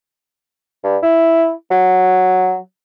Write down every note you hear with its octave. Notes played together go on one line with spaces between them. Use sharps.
G2
E4
F#3